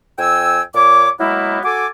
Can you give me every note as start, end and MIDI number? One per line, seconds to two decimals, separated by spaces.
0.19 0.61 41
0.19 0.61 79
0.19 0.61 80
0.19 0.61 88
0.74 1.09 46
0.74 1.09 73
0.74 1.09 86
1.20 1.60 54
1.20 1.60 56
1.20 1.60 58
1.20 1.60 59
1.20 1.60 64
1.64 1.87 66
1.64 1.87 69
1.64 1.87 80
1.64 1.87 86